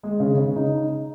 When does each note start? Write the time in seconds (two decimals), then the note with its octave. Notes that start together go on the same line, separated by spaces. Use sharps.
0.03 G#3
0.20 C#3
0.38 C#3
0.56 D#4